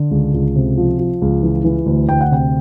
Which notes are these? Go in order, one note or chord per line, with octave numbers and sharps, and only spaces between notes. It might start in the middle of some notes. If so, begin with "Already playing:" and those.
Already playing: D3
C#2
C#2
C3
F3
F3
C#2
E3
E3
D2
D2 G5
F#5
C3 G5